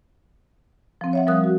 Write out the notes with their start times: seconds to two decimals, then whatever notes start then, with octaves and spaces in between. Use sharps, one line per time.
1.01 F3 C4
1.13 C#5 E5 F#5
1.27 F3 G3 A#4 D#6 F#6
1.44 F#4